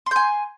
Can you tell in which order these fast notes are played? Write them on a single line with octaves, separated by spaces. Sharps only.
C6 G6 G#5